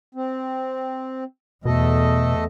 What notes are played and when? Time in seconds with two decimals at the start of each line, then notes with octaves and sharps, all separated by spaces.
0.15 C4
1.65 E2 B2 A3 A4 D#5